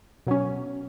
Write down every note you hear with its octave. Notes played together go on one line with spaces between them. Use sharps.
B2 F#3 C#4